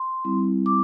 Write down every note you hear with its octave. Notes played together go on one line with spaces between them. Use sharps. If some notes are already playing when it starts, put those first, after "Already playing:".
Already playing: C6
G3 C4 E4
D6